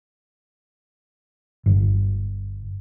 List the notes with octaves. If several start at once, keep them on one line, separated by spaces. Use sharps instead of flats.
G1